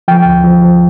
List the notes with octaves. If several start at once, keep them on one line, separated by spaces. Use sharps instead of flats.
F3 G5
D2
F3
F3